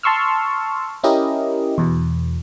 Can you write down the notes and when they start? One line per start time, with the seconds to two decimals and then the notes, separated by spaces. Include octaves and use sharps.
0.03 A5 C6 C#6 E6 F6
1.04 C#4 E4 G4 A#4 D#5
1.78 E2 B2